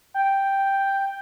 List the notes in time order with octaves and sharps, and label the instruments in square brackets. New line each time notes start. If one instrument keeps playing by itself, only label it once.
[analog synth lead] G5